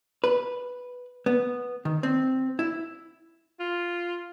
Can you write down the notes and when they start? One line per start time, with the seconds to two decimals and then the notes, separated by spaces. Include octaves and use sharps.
0.24 B4
1.26 B3
1.85 D#3
2.03 C4
2.59 E4
3.60 F4